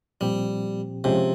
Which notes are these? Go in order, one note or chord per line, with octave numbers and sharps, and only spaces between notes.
A#2 F3 G3 C4 G4
C3 F3 G#3 C#4 G4